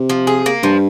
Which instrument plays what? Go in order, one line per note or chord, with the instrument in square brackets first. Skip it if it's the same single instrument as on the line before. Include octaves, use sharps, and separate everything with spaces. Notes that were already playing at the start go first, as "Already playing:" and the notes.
Already playing: [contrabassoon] C3
[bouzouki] F3
G#4
A#3
[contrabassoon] G2 [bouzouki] F3